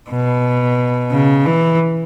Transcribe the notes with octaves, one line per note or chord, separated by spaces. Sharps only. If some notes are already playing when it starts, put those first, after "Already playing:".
B2
C#3
E3